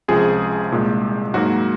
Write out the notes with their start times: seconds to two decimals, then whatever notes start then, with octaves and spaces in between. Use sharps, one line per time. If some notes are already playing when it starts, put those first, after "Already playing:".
0.08 C#2 C3 F3 G#4
0.71 C2 A#2 G#3
1.34 G#2 F#3 A#3 F#4